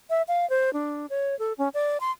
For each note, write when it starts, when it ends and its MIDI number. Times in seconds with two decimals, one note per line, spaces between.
0.10 0.22 76
0.28 0.48 77
0.50 0.73 72
0.73 1.06 62
1.10 1.38 73
1.39 1.53 69
1.58 1.69 61
1.74 1.98 74
2.00 2.11 84